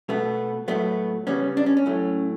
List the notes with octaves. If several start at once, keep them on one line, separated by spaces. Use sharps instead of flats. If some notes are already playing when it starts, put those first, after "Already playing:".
B2 A3 B3
A2 F#3 A3 B3
C#3 G3 B3 C#4
D4
C#4
C#4
A2 F#3 A3